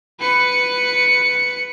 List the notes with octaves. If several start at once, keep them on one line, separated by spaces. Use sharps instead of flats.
B4 C#7